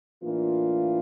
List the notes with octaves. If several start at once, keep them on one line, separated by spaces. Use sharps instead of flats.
A2 E3 A#3 D4 F4